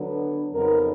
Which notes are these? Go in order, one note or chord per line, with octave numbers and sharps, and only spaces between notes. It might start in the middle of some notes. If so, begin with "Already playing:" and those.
Already playing: D3 F#3 B3 D4
F2 C#3 F#3 B3 D#4 A#4